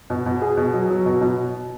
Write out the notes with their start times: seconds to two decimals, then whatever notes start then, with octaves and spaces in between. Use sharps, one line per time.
0.10 B2
0.26 B2
0.42 G#4
0.57 B2
0.74 F#3
0.90 F#3
1.06 B2
1.21 B2